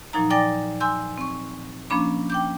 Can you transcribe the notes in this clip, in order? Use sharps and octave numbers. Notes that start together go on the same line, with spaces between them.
A#2 F3 F#3 D#4 A#5
D5 G5 G#5 D6 A6 A#6
G#5 C6 E6 G6
C4 C#6
F3 A#3 C#4 D4 B5 D6
G5 D6 G6